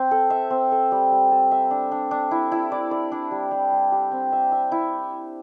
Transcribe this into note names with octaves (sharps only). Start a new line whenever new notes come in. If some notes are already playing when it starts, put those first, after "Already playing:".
Already playing: C4
A4
E5
C4
A4
G3
G3
A4
E5
D4
D4
D4
E4
E4
D5
D5
D4
G3
G3
G3
G4
C4
E5
E5
E4